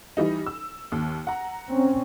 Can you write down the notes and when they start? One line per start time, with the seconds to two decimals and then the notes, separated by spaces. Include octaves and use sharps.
0.17 E3 G3 D#4
0.46 E6
0.92 D#2
1.27 F#5 A#5
1.71 C4 C#4